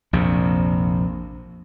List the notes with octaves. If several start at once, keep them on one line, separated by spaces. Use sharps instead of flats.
A#1 F2 C3